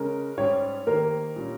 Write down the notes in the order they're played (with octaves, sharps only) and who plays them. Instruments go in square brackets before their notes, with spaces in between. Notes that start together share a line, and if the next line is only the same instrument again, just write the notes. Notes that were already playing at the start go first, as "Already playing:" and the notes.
Already playing: [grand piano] C#3 G#3 C#4 [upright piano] A#4
[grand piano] G#2 G3 C#4 G4 [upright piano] C#5
[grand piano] D#3 A#3 D#4 G4 C5 [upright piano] A#4
[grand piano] A#2 G3 C#4